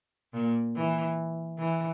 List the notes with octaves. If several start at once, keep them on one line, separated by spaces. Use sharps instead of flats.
A#2
E3
E3